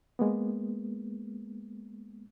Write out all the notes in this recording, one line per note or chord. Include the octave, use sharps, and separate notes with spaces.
G#3 A#3 B3